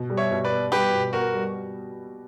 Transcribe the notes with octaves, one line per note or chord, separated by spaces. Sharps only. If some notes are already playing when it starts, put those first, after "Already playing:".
Already playing: B2
G3
C#5 E5
B2
B4 D5
B3
G3 G4 B4
B2
B3 F#4 A#4
G3